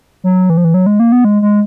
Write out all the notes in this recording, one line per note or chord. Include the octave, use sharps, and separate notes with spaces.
F#3
E3
F3
E3
F#3
G#3
A#3
B3
G#3
G#3